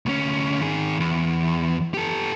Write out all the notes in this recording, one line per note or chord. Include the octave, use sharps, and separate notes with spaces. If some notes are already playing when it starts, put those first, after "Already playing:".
D2 C#4
D#3 G#4
E2
G4 A4